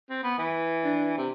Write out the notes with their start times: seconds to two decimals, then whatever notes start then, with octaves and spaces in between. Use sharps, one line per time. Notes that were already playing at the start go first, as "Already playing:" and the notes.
0.09 C4
0.24 B3
0.38 E3 B4
0.84 D4
1.17 C3